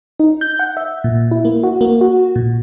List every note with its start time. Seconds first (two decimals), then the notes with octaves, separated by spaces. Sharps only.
0.20 D#4
0.41 G6
0.59 F#5
0.77 E5
1.04 A#2
1.31 E4
1.45 A#3
1.63 F#4
1.81 A#3
2.01 F#4
2.36 A#2